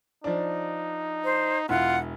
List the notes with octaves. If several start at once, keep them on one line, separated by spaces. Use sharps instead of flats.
F3 D4 D#4
C5
E1 E4 F4 F#5